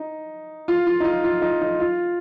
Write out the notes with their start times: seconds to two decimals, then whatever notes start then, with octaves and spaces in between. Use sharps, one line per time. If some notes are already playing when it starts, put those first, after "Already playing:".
Already playing: D#4
0.68 F4
0.87 F4
1.00 D#4
1.05 F4
1.24 F4
1.42 D#4
1.61 D#4
1.80 F4